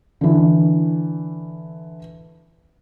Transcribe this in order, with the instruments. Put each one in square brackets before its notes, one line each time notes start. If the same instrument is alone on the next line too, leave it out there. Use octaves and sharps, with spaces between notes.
[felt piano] D3 E3